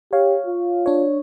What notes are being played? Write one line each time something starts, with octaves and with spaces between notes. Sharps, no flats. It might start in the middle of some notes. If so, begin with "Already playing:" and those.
G4 C#5 F5
F4
D4 C#5